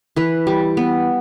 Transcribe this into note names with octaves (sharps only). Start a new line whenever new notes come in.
E3 B4
G3
B3